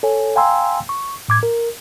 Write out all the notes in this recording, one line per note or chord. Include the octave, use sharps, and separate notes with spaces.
A4 C#5 G#5
F5 G5 G#5 A#5 C6 E6
C#6
A2 D6 G#6
A#4